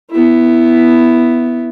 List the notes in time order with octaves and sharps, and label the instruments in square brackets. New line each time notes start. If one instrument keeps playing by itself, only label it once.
[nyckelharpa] B3 E4